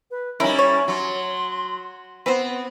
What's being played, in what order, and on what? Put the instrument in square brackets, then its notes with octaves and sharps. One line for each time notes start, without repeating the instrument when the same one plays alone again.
[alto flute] B4
[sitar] G3 E4 [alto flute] C#4 [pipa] D#4 A#4
[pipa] C#5
[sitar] F#3 [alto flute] C6
[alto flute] B3 [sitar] C4 [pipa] B4 C5